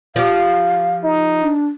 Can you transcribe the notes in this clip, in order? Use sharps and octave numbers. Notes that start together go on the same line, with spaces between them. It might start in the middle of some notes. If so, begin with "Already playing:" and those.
F3 G4 F5
D#4
D4